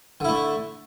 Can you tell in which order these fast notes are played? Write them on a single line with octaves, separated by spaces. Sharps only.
D3 E4 A3